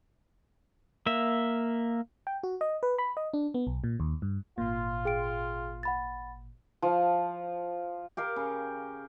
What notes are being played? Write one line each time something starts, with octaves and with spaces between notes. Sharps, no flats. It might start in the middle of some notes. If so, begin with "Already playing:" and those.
A#3 E5
G5
F#4
D#5
B4
B5
D#5
D4
B3
B1
A#2
D#2
G2
G#1 A#2 F4
G#4 G5 D7
F#5 B5 A6
F3
G4 A#4 F5
C#3